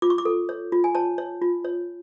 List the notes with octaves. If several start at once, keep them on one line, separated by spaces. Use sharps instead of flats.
F4 D6
C#6
D6
A4
C#5
F4
G#5
C#5 A5
C#5
F4
C#5